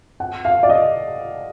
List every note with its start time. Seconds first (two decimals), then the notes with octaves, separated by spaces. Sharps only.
0.20 F#5
0.45 F5
0.63 D5
0.69 D#5